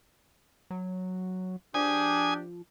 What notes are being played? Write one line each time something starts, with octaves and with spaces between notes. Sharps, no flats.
F#3
F3 D4 G4 G#5 D#6